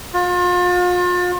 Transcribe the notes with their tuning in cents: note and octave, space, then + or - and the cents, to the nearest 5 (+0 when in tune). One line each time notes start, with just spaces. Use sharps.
F4 +35